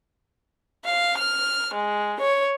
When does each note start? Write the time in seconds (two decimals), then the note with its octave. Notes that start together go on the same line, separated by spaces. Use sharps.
0.84 F5
1.19 F6
1.75 G#3
2.21 C#5